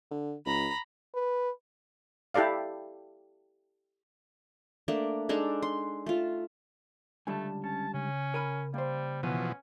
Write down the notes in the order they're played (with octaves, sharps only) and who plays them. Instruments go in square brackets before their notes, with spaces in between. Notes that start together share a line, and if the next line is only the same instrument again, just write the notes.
[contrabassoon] D3
[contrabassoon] C#2 [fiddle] A#5 B5
[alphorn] B4
[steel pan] E4 G4 A4 D5 F5
[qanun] A3 A#3 D4
G#3 D4 D#4 A4
C6
A3 F4
[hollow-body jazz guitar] C#2 D3 G3 [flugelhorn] A3 [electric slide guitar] G#5 A5
[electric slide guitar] C#4 [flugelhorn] A5
[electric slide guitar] C#3 [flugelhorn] C#4
[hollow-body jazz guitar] A#4 G#5 B5
[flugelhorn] G3 [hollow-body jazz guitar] A#3 C5
[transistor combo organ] B2 E3 F3 [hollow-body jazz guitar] B3 [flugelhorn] C#4